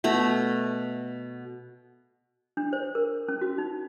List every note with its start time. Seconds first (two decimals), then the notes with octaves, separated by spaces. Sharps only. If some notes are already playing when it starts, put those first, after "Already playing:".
0.04 B2 A3 A#5 B5
2.57 D4
2.73 C5
2.95 A#4
3.29 C#4
3.41 F#4
3.58 D#4